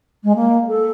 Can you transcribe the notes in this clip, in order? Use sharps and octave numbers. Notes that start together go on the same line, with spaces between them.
G#3
A#3
A4